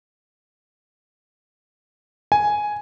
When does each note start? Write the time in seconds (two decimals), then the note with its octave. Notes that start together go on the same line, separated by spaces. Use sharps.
2.32 G#5